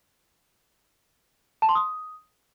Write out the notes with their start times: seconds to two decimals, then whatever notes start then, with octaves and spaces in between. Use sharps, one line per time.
1.62 A5
1.69 C6
1.75 D#6